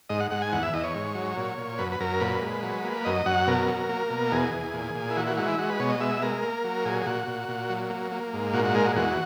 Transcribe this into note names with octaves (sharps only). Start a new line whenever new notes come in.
G#2 D#5
F#5
G#2 F#5
G#5
E2 F#5
E5
E2 D#5
C#5
G#2
F#3
A#2
A#2
F#2 B4
B4
F#2 A#4
A#2 B4
G#3
F#3
A#3
F#2 D#5
F#2 F#5
B2 A#4
F#3
A#3
B2
E2 G#4
E2
A#2
A#2
E4
E3 F#4
F#4
G#3 F#4
E4
G#3 F#4
B4
B2 C#5
D#5
G#3 E5
G#3 A#4
A#3
F#3
A#2 G#4
G#4
A#2 F#4
A#2
A#2
F#3
A#3
A#3
G#2
A#2 F#4
F#4
G#3 A#4
F#4
E2 F#4